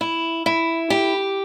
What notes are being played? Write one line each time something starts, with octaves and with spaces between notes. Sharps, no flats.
E4
E4
G4